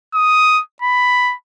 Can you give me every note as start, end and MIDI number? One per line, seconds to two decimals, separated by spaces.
0.14 0.61 87
0.82 1.34 83